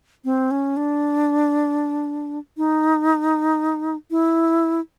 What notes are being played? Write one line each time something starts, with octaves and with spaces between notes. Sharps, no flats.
C4
C#4
D4
D#4
E4